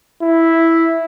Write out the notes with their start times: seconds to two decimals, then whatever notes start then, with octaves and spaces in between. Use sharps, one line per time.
0.23 E4